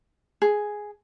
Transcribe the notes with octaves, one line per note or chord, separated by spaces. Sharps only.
G#4